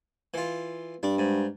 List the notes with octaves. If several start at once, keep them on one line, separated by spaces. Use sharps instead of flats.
E3 F4
G2 D4
G#2